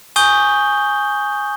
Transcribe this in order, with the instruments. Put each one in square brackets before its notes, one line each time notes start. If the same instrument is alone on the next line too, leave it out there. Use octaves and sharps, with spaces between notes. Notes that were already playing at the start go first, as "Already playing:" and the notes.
[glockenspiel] G#5 C#6 D#6 G6 G7